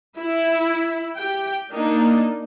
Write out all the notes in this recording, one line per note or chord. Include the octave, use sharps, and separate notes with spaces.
E4
G4 G5
A#3 D4 D#4